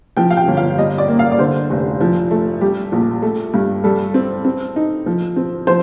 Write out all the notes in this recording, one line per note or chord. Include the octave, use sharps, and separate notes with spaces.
F3 G5
F5
G5
G1
F5
G3 D#5
D5
A#3
F5
D5
D3 C5
F1
F3
A3
G3 G4
A#1
A3
G2
G3 A4
C4
C4
D#4
F3
C4
F3 C5